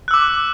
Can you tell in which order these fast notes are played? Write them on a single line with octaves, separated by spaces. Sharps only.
F#6 E6 D6